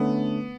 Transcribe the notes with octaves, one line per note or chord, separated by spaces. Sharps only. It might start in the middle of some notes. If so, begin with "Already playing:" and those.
Already playing: D3 A3 B3 C#4